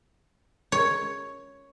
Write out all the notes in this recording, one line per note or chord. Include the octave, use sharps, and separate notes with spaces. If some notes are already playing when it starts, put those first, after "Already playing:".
C#5